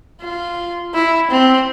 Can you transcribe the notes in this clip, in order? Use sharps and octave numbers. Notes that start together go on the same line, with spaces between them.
F4
E4
C4